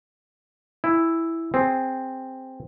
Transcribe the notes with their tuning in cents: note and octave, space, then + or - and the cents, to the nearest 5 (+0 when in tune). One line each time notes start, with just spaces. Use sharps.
E4 +0 G#5 -30
C4 +0 G#4 +0